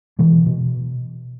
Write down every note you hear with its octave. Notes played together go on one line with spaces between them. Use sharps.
B2 E3
B2